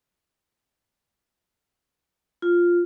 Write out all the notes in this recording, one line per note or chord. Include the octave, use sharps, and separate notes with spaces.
F4